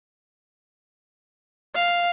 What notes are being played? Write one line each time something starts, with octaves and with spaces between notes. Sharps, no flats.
F5